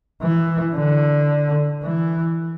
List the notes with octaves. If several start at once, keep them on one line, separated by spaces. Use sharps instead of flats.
E3
D3
E3